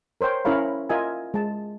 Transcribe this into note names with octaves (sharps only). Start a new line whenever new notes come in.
A#4 C5 C#5 G5
C#4 E4 A#4 C#5 F5 B5
F4 A#4 D#5 E5 G#5
G#3 A5